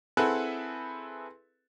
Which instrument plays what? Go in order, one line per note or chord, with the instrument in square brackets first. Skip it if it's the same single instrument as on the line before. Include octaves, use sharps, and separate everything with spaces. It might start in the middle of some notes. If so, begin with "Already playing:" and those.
[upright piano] C4 E4 G#4 A4 B4 F#5